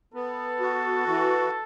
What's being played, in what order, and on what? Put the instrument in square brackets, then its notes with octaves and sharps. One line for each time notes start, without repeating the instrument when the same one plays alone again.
[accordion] B3 [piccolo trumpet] A4
[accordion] F#4
E3